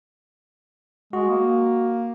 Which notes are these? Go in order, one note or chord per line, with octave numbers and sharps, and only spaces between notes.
G#3 F#4
A#3